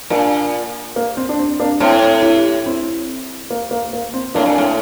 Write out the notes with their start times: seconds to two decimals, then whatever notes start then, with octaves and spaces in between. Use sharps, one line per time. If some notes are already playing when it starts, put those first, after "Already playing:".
0.10 A#2 A#3 D4
0.96 A#3
1.17 C4
1.29 D4
1.39 C4
1.60 A#3 D4
1.80 A2 C4 E4
2.22 E4 G4
2.66 C4 E4
3.50 A#3
3.71 A#3
3.93 A#3
4.14 C4
4.35 A2 A#3 D4
4.46 A#2
4.58 A2